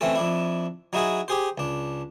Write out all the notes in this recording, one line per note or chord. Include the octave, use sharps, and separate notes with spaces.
E3 A3 C4 C#4 A4
F2 D4 E4
F#3 D#4 E4 F#4 G#4
G4 G#4 C5
C#2 D4